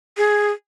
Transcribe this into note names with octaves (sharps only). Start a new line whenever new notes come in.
G#4